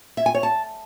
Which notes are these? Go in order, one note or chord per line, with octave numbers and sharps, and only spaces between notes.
E5
G#5
C#5
A5